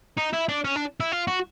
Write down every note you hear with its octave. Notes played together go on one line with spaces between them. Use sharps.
D#4
E4
D4
C#4
D4
E4
F4
F#4